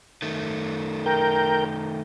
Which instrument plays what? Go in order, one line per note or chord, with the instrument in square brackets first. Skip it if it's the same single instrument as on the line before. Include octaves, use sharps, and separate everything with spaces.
[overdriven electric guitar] D#3 A3
[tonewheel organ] A#4 G5